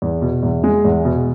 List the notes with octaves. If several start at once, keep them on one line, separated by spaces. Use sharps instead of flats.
E2
B2
E2
G#3
E2
B2